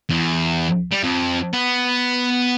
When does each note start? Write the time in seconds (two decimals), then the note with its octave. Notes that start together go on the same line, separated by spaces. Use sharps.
0.09 E2
0.91 G3
1.03 F2
1.53 B3